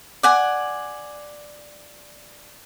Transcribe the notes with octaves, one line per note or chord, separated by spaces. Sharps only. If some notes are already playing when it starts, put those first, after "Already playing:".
D5 F#5 G#5